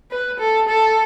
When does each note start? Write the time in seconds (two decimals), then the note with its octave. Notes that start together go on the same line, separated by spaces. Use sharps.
0.11 B4
0.40 A4
0.68 A4